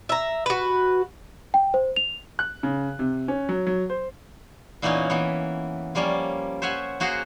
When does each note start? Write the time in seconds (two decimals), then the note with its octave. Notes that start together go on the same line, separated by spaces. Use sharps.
0.09 E5 A#5
0.46 F#4 B4
1.54 G5
1.74 C5
1.96 F7
2.39 F#6
2.63 C#3
2.99 C3
3.28 C#4
3.49 F#3
3.67 F#3
3.90 C5
4.82 A#2 E3 A#3 B3 C#4 D#4
5.10 E3 A#3 B3
5.95 F3 G3 A#3 C#4 F4
6.62 C5 C#5 E5 F#5 G#5
7.00 A#3 F#4 G#4 C5 F5 F#5